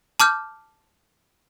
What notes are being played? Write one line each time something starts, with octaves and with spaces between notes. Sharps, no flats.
A5 D6 F6 G6